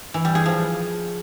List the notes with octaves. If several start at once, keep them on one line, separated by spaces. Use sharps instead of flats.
E3
G3
G#4
F3